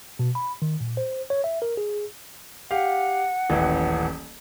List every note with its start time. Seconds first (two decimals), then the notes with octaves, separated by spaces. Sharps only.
0.19 B2
0.35 B5
0.62 D#3
0.80 A#2
0.97 C5
1.30 C#5
1.44 E5
1.62 A#4
1.77 G#4
2.71 G4 F5 F#5
3.50 D#1 A1 E3